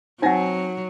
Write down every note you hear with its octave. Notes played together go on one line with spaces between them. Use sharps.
F#3 C4 D#4 F#5 G#5 A#6